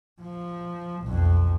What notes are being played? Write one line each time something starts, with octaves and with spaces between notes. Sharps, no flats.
F3
B1 F2